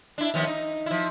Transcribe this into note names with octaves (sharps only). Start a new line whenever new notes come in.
D4 E4
D#2 F3 B3
D#4
F3 E4